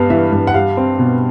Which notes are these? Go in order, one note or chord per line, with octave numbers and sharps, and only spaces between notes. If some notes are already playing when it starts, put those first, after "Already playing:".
Already playing: G2 G3 B3 F5
E3 E5
G2
F#5
G3 F5
C4
B2